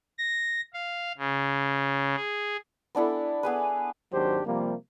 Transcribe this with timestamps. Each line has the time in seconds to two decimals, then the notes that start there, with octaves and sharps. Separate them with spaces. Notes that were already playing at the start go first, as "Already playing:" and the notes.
0.18 A#6
0.74 F5
1.18 C#3
2.16 G#4
2.95 B3 D4 E4 A4
3.43 B3 G#4 B4
4.12 G#1 D#2 F#3 D4 G4 C5
4.46 C3 F3 G3 A#3